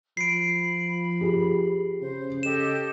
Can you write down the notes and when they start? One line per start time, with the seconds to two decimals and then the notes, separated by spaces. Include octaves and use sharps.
0.17 F3 B5 C7 D7
1.21 G4 G#4
2.01 C#3 C5
2.43 G4 A4 D#5 E7